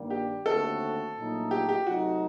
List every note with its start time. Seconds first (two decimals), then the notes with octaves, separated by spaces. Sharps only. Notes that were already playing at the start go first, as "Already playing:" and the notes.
Already playing: G2 D#3 G3 A#3
0.10 G4
0.45 D#2 D3 A3 C4 F#4 A4
1.16 A#1 A#2 F#3 A3 D#4
1.51 G4
1.69 G4
1.86 C3 F#3 A3 D#4 F#4